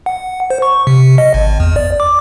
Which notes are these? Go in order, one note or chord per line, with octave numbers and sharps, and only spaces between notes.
F#5
C5
C#6
C3
D#5
G#1
E2
D5
D6